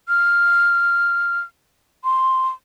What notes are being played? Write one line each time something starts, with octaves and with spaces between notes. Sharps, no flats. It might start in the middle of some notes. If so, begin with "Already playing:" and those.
F6
C6